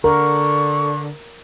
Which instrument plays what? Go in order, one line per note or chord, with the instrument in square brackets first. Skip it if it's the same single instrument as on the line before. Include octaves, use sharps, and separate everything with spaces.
[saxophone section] D3 [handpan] A#4 [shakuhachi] C#6